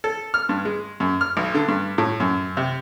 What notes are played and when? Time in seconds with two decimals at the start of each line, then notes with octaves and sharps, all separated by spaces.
0.04 A4
0.34 F6
0.49 G2
0.65 G#3
1.00 F#2
1.21 F6
1.37 B1
1.55 D3
1.68 G2
1.98 A2
2.20 F#2
2.57 C3